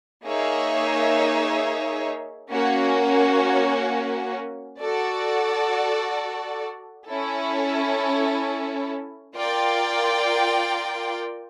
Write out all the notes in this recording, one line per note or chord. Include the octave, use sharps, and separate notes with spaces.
A#3 D#4 G#4 C#5 E5
A#3 C#4 F#4
F#4 A4 D5
C#4 E4 A4
F4 A#4 D5 G5